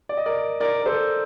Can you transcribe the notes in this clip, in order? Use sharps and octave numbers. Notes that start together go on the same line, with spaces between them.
D5
D#5
A#4 D5
A#4 D5
A#4
A4 C5